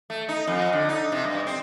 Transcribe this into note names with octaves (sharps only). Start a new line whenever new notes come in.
A3
D#4
F2
D3
D#4
C3
G2
C4